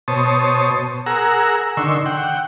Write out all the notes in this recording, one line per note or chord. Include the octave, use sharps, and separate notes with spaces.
B2 C5 C#5 A5 D#6
G#4 A#4 F#5 A#5 E6
D3 D#3 C6 C#6 E6
F#5 G5